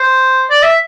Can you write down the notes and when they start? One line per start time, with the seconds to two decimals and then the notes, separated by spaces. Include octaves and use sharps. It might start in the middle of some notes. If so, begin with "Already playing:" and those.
Already playing: C5
0.50 D5
0.63 E5